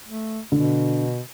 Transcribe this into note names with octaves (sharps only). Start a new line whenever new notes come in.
A3
B2 D3